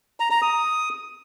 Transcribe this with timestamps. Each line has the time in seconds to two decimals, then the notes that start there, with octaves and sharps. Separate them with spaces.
0.20 A#5
0.31 A#5
0.42 D#6